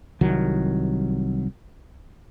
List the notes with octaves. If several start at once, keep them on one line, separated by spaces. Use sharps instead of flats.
C2 D#3 F#3